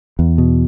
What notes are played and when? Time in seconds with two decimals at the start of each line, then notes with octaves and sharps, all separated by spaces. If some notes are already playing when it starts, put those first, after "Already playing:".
0.19 E2
0.38 B2